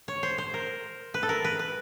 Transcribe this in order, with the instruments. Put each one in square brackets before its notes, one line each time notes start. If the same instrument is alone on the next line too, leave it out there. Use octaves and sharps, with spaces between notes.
[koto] C#5
C5
C5
A#4
B4
A4
A#4
B4
B4